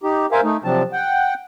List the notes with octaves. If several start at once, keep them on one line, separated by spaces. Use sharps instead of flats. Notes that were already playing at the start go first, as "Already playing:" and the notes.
D#4 G4
A#4 C5 E5 F5 G#5
A3 D#4
C3 F3 F#3 C4 D4 A5
F#5 G5